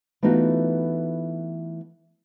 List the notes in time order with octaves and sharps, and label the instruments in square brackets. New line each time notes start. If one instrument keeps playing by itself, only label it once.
[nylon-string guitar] E3 A3 B3 D#4 F4 F#4